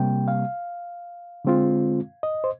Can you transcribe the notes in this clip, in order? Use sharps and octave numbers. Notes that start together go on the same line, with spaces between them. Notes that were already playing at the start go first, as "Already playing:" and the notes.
Already playing: C3 G3 A#3 G5
F5
D3 G#3 C4 F4
D#5
C5